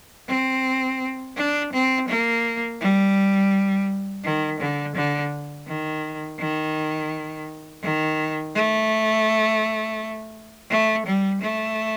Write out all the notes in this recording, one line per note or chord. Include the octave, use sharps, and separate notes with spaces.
C4
D4
C4
A#3
G3
D#3
D3
D3
D#3
D#3
D#3
A3
A3
G3
A3